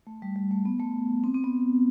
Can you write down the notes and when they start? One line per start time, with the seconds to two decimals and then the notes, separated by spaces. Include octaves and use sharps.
0.07 A3
0.22 G3
0.36 G3
0.51 A3
0.65 B3
0.80 A3
1.24 C4
1.34 C4
1.44 B3